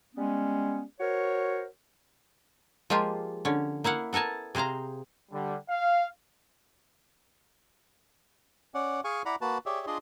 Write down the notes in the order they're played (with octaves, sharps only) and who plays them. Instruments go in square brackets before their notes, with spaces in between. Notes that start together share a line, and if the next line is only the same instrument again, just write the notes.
[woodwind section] G3 G#3 B3 C#4
F#4 A#4 C5 C#5
[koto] F3 G#3 A#3 F4 G4
D3 C#4
A#3 E4 F5 F#5
B3 A4 A#4 G#5 A5
C3 G#4 C5 F5 A#5
[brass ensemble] D3 G3
F5
[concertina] C#4 D5 F#5
G#4 F5 G#5 C#6
E4 D5 F#5 A#5 B5
A#3 F#4 B4 A5
G4 G#4 C#5 D5 E5
D4 F4 G#4 D5 D#5 C6